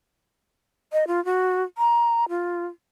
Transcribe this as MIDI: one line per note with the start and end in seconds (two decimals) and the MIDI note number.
0.93 1.07 75
1.07 1.23 65
1.25 1.63 66
1.78 2.29 82
2.29 2.66 65